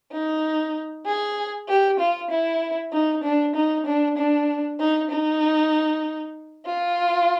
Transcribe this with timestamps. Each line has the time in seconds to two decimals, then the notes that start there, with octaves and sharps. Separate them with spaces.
0.12 D#4
1.05 G#4
1.68 G4
1.99 F4
2.30 E4
2.92 D#4
3.23 D4
3.55 D#4
3.86 D4
4.17 D4
4.79 D#4
5.10 D#4
6.66 F4